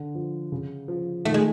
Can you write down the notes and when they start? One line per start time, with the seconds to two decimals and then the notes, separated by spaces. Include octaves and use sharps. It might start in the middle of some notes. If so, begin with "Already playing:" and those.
Already playing: D3
0.15 F3
0.52 C#3
0.88 F3
1.25 D#3 A3
1.34 G#3